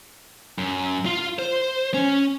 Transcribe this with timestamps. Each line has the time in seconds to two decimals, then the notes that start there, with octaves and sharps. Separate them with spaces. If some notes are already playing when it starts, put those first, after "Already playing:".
0.58 F#2
1.06 F4 F5
1.39 C5
1.94 C#4